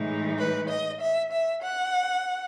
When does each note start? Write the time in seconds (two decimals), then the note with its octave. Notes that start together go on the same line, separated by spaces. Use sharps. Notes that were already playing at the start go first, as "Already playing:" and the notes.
Already playing: A2 E3 G#3 D#4
0.38 B4
0.69 D#5
1.00 E5
1.32 E5
1.62 F#5